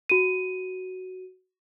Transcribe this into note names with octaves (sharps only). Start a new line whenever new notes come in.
F#4 D#7